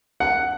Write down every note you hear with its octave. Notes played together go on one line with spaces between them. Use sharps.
F#5